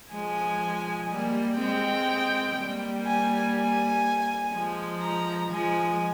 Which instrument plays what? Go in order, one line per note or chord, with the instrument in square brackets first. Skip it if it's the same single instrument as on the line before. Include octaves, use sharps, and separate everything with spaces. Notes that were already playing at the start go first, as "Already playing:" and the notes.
[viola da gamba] F3 G#3 [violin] G#5
[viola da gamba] G3 A#3
[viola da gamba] G#3 C4 [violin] G5
[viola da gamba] G3 A#3
[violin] G#5
G#5
[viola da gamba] F3 G#3
[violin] A#5
[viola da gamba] F3 G#3 [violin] G#5